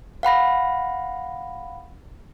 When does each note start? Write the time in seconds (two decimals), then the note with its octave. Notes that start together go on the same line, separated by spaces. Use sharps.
0.23 F5 F#5 B5 A#6